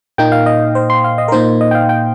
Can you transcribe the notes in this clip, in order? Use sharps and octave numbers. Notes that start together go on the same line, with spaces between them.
A#2 A#3 D#4 G5
F5
D#5
C5
C6
F5
D#5
A#4
A#2 A#3 D#4 C5
D#5
G5
F5
G5